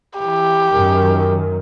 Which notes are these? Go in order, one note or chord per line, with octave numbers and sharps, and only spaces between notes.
E3 G4
F#2 D#3